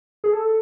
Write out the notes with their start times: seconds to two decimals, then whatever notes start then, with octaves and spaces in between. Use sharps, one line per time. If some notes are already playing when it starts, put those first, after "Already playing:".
0.24 G#4
0.33 A4